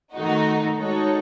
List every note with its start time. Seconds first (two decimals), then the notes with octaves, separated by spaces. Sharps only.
0.14 D#3 A3 D#4 F#4
0.76 G#3 D#4 F#4 A4 C#5